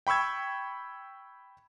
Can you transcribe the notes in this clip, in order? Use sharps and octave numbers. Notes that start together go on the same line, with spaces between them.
G5 B5 C#6 E6 G#6